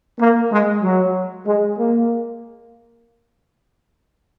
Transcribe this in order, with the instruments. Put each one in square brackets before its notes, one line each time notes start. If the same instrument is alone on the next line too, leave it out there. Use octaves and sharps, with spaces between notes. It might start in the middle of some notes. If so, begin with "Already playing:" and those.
[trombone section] A#3
G#3
F#3
G#3
A#3